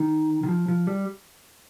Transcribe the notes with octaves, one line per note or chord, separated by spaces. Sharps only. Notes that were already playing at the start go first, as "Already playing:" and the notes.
Already playing: D#3
D#3
F3
F3
G3